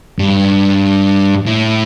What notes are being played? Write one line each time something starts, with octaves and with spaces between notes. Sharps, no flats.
G2
A2